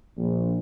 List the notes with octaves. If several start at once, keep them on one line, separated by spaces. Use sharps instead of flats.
A#1